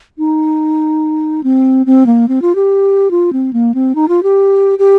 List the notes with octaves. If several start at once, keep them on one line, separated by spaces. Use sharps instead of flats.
D#4
C4
C4
A#3
C4
F4
G4
F4
C4
A#3
C4
D#4
F4
G4
G4